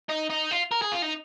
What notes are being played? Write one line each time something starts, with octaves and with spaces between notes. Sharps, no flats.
D#4
D#4
F4
A#4
G#4
F4
D#4